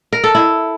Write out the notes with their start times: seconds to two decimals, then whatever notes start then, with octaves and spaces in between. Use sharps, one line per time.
0.13 A#4
0.24 A4
0.35 E4